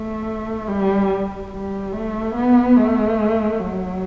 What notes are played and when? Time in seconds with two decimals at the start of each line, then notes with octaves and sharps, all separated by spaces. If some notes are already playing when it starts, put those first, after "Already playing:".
Already playing: A3
0.68 G3
1.52 G3
1.93 A3
2.35 B3
2.76 A3
3.60 F#3